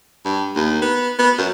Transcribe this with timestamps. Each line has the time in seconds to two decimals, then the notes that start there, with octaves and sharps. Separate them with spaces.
0.25 G2
0.56 D#2
0.82 B3
1.19 B3
1.38 F#2